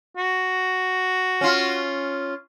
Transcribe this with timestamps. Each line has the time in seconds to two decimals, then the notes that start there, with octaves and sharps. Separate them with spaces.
0.17 F#4
1.41 C#4 F4